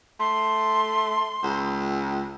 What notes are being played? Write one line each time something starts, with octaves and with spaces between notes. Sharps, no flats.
A3 C6
C#2